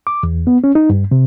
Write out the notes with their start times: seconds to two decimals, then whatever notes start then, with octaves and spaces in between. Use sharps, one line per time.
0.07 D6
0.23 E2
0.47 B3
0.64 C#4
0.75 D#4
0.90 G2
1.11 C3